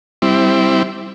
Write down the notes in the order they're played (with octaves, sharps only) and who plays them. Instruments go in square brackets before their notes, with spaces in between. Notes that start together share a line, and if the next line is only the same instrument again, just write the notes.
[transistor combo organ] G3 C4 E4